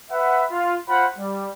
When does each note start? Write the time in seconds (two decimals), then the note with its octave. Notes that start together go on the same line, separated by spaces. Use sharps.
0.12 B4 E5 F#5
0.52 F4
0.89 F4 C5 F#5 B5
1.19 G3